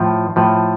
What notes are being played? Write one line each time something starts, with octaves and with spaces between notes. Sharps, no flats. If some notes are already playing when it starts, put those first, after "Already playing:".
Already playing: A2 F3
A2 F3